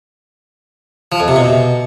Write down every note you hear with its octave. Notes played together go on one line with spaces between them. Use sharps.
F3
F2
C3
B2